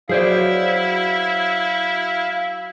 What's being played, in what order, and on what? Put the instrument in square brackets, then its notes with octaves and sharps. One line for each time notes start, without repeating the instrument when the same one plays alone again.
[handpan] F#3 [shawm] E4 [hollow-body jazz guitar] G#4 C5 D5 [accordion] F5